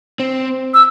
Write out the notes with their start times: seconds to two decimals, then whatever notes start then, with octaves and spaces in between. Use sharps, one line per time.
0.20 C4
0.74 E6